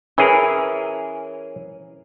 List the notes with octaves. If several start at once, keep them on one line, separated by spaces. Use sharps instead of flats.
E3 C#4 G#4 A#4